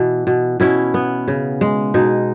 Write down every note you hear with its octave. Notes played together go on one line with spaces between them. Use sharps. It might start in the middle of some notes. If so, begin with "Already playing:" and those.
Already playing: B2 E3
B2
B2 C#4 E4
B3
C#3
G#3
B2 D#4